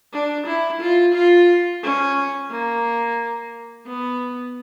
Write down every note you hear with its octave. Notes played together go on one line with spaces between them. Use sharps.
D4
E4
F4
F4
C#4
A#3
B3